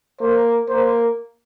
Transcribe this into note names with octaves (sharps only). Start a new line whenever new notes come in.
A#3 C5
A#3 C5